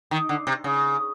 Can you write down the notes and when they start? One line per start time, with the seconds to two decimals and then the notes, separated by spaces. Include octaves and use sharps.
0.11 D#3
0.29 D3
0.47 C3
0.64 C#3